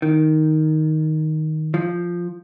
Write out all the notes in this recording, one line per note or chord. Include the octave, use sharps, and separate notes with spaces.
D#3
F3